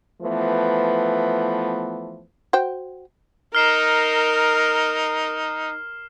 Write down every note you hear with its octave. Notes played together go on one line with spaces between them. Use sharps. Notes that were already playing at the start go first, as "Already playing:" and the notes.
E3 F3 A3 B3
F#4 C5 G5
D#4 A#4 F6 C7 E7